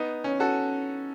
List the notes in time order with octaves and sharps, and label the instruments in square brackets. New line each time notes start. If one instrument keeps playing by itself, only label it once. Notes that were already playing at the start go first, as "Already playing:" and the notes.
Already playing: [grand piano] B3 D#4
C#4
F#4 A4